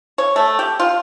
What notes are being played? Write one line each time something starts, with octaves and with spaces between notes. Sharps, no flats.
C#5
A3
G4
F4